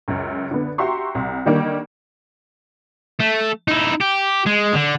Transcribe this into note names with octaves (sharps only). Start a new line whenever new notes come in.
C#2 F#2
D3 B3
F#4 G4 E5 A#5 C6 C#6
C2
D3 D#3 G3 A#3
A3
D#4 E4
G4
G#3
D3